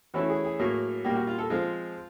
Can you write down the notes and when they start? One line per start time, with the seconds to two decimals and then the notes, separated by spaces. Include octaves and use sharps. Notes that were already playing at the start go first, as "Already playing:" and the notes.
0.14 E3 A3 C#4 E4 F#4
0.29 G#4
0.44 G#4
0.59 A2 F#3 A#3
1.04 A#2 G3 A#3 G4
1.16 F#4
1.27 F4
1.38 A4
1.50 F3 G#3 C4 F4